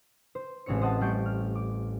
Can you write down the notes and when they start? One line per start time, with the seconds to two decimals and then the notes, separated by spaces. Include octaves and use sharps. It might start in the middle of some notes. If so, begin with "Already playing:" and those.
0.35 C5
0.66 A1 G#3 C4 C#5 C#7
0.82 C5 D#5 F#5 A5
1.01 G3 A3 C#6 G6 C7 D7
1.26 F6
1.55 D6